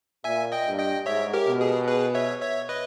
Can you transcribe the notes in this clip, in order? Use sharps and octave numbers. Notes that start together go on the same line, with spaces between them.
A#2 E5 G#5
D#5 G5
G2
D#5 G5
G#2 C#5 E5
G4 A#4
B2
G#4
G#4 B4
C#5 E5
C#5 E5
B4 D#5